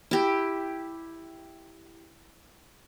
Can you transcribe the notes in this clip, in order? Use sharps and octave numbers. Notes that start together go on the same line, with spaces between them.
E4 G4